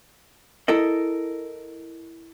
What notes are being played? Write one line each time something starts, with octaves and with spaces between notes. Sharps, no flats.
E4 A4 A#4 D#5